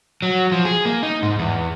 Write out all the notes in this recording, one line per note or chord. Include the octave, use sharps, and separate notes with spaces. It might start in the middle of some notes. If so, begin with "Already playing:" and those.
F#3
F3
G#4
A#3
D#4
G#2
E2